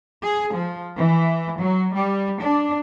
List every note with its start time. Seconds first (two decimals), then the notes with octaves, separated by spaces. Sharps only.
0.22 G#4
0.55 F3
0.95 E3
1.60 F#3
1.93 G3
2.39 D4